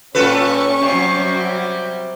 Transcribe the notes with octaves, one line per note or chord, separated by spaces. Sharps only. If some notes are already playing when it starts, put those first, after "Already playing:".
A#2 G3 C#4 F4 A4 B4 C#6
C3 F#3 G3